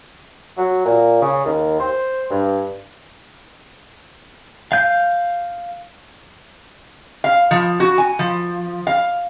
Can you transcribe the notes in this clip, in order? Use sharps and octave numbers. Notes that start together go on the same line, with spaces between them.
F#3
A#2
C#3
D#2
C5
G2
F5 G6
F5
F3
F#4
G#5
F3
F5